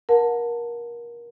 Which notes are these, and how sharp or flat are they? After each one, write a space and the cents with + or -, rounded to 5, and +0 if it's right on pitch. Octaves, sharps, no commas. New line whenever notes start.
A#4 +25 F#5 -30 A5 +15